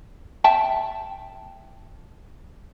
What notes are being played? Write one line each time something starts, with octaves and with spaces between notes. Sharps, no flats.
E5 G5 A5